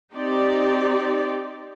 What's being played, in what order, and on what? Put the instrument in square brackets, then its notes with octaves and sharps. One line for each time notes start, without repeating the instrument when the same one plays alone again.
[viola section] C4 D#4 G4 D5